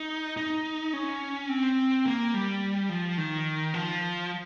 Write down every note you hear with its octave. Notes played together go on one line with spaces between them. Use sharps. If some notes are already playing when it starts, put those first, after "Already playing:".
Already playing: D#4
D#4
C#4
C4
A#3
G3
F3
D#3
F3